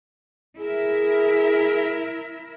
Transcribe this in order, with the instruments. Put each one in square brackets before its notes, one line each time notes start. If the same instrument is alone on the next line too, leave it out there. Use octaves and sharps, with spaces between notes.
[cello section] E4 A#4 E5 [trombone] G#4